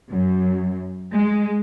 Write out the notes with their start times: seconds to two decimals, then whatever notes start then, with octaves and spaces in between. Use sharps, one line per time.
0.10 F#2
1.13 G#3